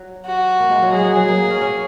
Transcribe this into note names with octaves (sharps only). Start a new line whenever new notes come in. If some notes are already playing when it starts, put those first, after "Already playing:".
Already playing: F#3
F#4
A#3
G#3
F#3
G#3 G#4
F#3
F#3
A#3
C#4
C#4